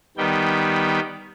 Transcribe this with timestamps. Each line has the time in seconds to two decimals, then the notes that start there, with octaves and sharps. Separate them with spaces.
0.17 D#3 G3 B3 G5